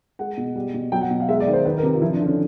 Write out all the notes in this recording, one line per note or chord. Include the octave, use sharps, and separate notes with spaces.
G#3 F#5
B2
G3
B2
F#3 G5
F#5
B2
F5
G#3 E5
D5
D#3
C5
D#3 B4
A#4
C3
F4
F3 E4
D4
D3
C#4